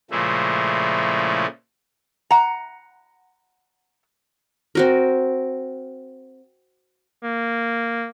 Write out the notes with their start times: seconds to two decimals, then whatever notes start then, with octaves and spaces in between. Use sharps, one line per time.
0.11 A#2 C#3 F3 G#3 A3 E4
2.31 F#5 A#5
4.75 C4 F#4 A#4
7.23 A#3